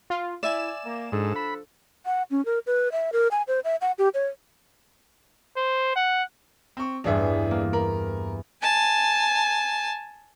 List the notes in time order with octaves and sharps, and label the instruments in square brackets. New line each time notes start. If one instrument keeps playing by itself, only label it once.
[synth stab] F4
[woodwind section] E4 [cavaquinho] D5 E5 G#5 [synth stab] E7
[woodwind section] A#3
[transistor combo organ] G#2 [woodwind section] F3 D4 A4
[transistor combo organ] B5
[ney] F#5
C#4
A#4
B4
E5
A#4
G#5
C5
E5
F#5
G4
C#5
[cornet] C5
F#5
[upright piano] C4 C#6
[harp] A1 E2 G2 [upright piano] D4 G#4 E5
[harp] A#3
[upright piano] A#4 [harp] B5
[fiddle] G#5 A5